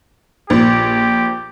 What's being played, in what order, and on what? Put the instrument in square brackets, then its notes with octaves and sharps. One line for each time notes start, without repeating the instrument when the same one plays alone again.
[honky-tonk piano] A#1 [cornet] G4